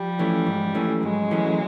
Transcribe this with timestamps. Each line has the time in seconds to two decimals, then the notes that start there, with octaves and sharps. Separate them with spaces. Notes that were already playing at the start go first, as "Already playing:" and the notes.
Already playing: F3 G3
0.19 E3 A3 C#4
0.47 G#2
0.75 E3 A3 C#4
1.03 G#2 F#3 G#3
1.31 E3 A3 C#4